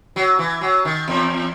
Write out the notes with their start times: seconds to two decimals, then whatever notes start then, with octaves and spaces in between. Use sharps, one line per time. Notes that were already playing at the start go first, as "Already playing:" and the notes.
0.16 F#3
0.39 E3
0.61 F#3
0.85 D#3
1.08 E2